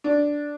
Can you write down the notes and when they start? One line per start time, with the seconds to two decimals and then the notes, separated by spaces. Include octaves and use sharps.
0.04 D4